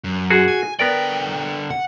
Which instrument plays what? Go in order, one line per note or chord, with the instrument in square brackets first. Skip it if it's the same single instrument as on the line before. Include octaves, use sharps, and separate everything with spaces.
[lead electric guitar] F#2
[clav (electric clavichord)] F#4 G#4
[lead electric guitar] G#5
[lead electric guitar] D3 G5 [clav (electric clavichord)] B3 A#4 D5
[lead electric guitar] F#5